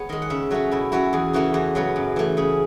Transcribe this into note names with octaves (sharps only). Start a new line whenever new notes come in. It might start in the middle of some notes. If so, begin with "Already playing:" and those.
Already playing: B3 G#4 B4 C#5
D#3 G#3 D#5
F#5
C#3 E5
F#3 A3 C#4 F#4
B2 E4
F#3 C#4 E4 F#4
E2 G#4
C#3 E3 A3 C#4 F#4
E2 F#4
C#3 F#3 B3
F#2
E3 A3
C#3 G#4